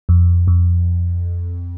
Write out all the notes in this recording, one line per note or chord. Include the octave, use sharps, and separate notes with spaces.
F2
F2